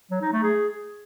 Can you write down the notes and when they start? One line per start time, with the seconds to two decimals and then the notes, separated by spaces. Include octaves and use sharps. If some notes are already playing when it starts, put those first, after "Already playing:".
0.11 F#3
0.22 D#4
0.32 A3
0.43 G#4